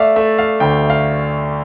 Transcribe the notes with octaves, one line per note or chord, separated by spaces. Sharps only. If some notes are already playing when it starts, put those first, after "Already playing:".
Already playing: A3 D5 E5 F5
A3 E5
F5
D2 G5
F5